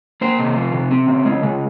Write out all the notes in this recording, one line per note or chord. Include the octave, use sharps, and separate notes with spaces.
A#3 C5
C3
F3
C3
C4
C#3
G#3
C#3